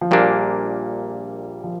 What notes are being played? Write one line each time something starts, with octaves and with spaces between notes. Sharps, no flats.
F3
A#1 A#2 G3 A#3 D4
F3